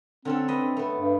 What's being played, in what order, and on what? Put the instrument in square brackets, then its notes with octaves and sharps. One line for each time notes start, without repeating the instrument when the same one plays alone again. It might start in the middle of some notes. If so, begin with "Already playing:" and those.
[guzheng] D3 C#4 A4 [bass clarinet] C4
[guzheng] B4 D#5 E5
A3 B3
[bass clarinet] G2